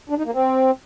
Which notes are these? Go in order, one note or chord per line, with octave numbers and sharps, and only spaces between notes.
D4
D#4
A#3
C4